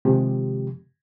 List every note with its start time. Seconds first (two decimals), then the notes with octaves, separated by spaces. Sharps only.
0.05 C3 D#3 F3 G#3 G4